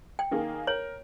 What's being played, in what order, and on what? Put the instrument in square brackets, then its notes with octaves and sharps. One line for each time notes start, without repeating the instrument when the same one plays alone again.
[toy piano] G5
[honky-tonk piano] D#3 A#3 G#4
[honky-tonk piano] A#4 [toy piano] C#5